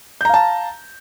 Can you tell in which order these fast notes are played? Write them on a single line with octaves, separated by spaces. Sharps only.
G6 A#5 F5 A5